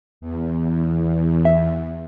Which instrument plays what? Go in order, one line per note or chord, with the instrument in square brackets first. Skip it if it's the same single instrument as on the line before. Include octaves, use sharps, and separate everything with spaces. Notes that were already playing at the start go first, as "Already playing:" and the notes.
[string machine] E2
[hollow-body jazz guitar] E5